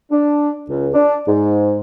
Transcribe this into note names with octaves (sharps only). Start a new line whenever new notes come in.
D4
C#2
D4
G#2